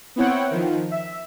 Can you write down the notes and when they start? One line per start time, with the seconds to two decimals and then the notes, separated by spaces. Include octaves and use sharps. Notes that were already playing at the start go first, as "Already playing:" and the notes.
0.16 B3 C4 E4 C#5 F#5 G5
0.51 D#3 F3
0.91 E5